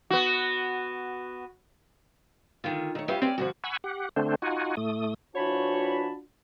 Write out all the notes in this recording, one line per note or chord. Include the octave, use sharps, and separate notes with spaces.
B3 F#4
D3 D#3 F4
D#3 A3 C#5
C#4 F4 G4 B4 E5
C4 C#4 D5
G2 D3 F3 F#4
F#5 G#5 B5 C#6 E6
G4 F#5
D3 A3 C4 D4 C5
D#4 F4 F#4 F#5 G#5
A2 A3 D#6
E3 D4 F4 F#4 C5 C#5 A5 B5